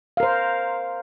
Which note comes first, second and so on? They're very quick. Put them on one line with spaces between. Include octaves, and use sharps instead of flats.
F5 A#4 C5